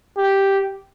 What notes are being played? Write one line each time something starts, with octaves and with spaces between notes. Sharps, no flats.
G4